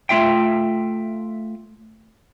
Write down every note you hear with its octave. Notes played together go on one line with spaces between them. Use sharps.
A3 F4 E5 G5